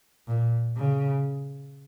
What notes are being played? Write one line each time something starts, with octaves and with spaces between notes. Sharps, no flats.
A#2
C#3